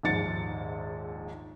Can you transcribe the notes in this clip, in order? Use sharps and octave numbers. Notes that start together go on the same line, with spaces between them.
A#1 D#2 G#2 A6 C#7